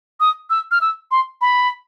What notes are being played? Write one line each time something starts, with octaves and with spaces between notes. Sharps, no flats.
D#6
E6
F6
E6
C6
B5